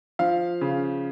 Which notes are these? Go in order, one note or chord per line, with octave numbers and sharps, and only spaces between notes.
F3 F5
C#3